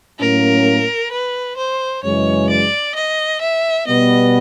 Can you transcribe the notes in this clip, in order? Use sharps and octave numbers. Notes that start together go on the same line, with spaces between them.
A2 F#3 A#3 C#4 A#4
B4
C5
F#2 C#3 E3 G#3 C#5
D5
D#5
E5
B2 G3 B3 D#5